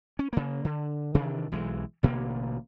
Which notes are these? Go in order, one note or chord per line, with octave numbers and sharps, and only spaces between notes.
C#4
C#3 A#3
D3
C3 D#3 E3 D4
B1 E3 G#3
A1 B2 D3 A#3